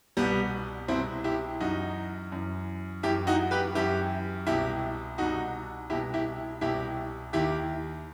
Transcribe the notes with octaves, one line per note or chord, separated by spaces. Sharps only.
C2 B2 G3 B3
C2 B2 C4 E4
E4 G4
F#2 E3 D#4 F#4
F#2 E3
F#2 E3 E4 G4
D#4 F#4
G4 B4
F#2 E3 E4 G4
C2 B2 E4 G4
C2 B2 D#4 F#4
C2 B2 E4 G4
E4 G4
C2 B2 E4 G4
D#2 D#3 E4 G4